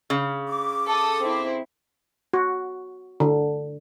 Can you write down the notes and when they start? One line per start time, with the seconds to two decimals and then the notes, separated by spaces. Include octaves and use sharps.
0.10 C#3
0.47 D6
0.88 A4 D#6
1.20 C4 E4
2.33 F#4
3.20 D3